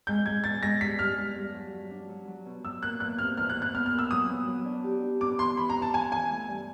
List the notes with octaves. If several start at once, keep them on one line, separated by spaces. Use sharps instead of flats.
G#3 G6
G#3 G#6
E2 A6
G#3 A#6
G2 B6
G2 F6
G2
G2
F#3
F#3
D4
F#3
F#3
B2
F#3 E6
A#3 F#6
E2 F#6
C3 F6
E2 F6
F#6
E2
F#6
B3 F6
F6
A#2
E6
F#3 D#6
B3
F#3
D4
G4
D4
B3 D6
E3 C6
E3 B5
A#5
E3
A5
E3 G#5
E3 G#5
A3
G2